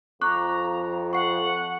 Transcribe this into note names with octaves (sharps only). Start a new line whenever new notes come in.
F2 A#5 C#6 D6 F#6
F#5 C#6 C7